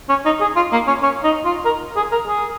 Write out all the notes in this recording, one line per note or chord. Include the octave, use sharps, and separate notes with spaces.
C#4
D#4
G#4
F4
A#3
C#4
C#4
D#4
F4
A#4
G#4
A#4
G#4